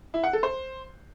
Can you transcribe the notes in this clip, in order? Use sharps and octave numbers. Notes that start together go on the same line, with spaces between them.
E4
F#5
A4
C5